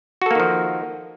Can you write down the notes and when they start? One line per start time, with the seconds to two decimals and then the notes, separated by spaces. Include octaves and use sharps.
0.22 F#4
0.26 A4
0.31 A#3
0.35 D#3
0.40 F3